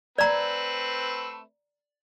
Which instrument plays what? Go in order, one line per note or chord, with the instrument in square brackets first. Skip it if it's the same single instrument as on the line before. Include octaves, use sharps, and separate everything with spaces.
[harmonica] A3 C4 B4 [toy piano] D5 A#5